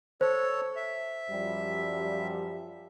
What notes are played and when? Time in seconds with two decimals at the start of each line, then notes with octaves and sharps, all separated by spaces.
0.21 A4 C5 C#5
0.76 E5
1.31 F#2 F3 G3